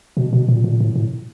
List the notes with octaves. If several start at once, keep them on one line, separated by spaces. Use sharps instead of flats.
B2
B2
A#2
A#2
A2
A2